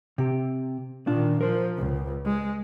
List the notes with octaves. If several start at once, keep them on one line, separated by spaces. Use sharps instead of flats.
C3 G4
A#2 D#3 D4 F4
F3 A#4 C5
C#2
G#3